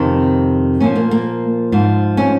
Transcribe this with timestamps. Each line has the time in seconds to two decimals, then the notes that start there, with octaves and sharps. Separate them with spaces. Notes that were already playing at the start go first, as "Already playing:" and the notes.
Already playing: F2 C3 D#3
0.80 A#2 F3 C#4
0.95 A#3
1.11 A#3
1.72 G#2 F3
2.17 C#4